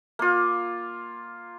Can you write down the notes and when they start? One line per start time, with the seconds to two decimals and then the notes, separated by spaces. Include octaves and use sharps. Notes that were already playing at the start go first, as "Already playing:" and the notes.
0.19 A#3 F4